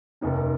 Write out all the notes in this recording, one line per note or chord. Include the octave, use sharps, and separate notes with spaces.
F1 D#2 D#3 A#3 C#4